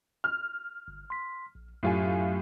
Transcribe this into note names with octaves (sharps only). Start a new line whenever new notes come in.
F6
G1
C6 B6
A#1
F#2 A2 F#3 F4 G4 G#5